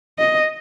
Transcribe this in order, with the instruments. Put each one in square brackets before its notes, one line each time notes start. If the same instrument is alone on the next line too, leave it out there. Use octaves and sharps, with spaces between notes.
[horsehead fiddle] D#5